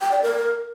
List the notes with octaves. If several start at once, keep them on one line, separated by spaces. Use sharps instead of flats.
G5
D5
A#4